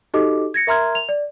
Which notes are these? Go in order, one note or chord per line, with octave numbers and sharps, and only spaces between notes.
D#4 F#4 G4 A4 D#5 D6
G#6 A#6 C#7
A#4 E5 A#5 C6 F6 G#6
F7
D5